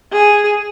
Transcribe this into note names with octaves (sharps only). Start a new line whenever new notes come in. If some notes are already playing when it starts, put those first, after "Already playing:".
G#4